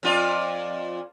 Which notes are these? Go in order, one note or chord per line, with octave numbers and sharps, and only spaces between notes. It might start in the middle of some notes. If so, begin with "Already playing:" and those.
F2 F4 D5